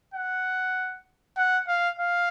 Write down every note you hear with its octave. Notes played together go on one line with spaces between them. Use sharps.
F#5
F#5
F5
F5